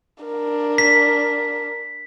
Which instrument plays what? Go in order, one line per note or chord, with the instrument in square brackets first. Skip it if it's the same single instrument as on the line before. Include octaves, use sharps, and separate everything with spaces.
[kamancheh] D4 A#4
[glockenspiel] B6